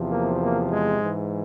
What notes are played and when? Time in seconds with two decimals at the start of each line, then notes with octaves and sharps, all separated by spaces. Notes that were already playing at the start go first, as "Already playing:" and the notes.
Already playing: E2 C3 F3
0.10 A#3
0.40 A#3
0.70 G#3
0.99 G#2 E3